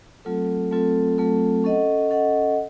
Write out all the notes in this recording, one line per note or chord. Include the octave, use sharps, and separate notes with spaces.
F#3 A3 C4 F4 A4
F#3 A3 C4 F4 A4
F#3 A3 C4 F4 A4
C#4 A4 D#5 F#5
C#4 A4 D#5 F#5